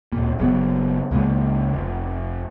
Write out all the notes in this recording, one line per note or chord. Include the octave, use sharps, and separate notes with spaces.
D1 A#2
F#1 C#3 F#3 B3
C#2 C#3 G#3 A#3
F1